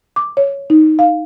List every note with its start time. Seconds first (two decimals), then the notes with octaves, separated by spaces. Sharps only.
0.16 D6
0.37 C#5
0.70 D#4
0.99 F5